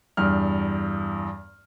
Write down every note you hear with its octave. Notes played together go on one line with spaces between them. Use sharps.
E2 G2 F6